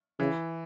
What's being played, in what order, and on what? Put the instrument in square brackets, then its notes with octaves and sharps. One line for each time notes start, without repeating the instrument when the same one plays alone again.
[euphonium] C#3 [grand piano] E3